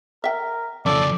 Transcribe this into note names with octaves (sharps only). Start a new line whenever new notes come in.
A#4 E5 G5
F2 C#3 C#4 F4 A4 D5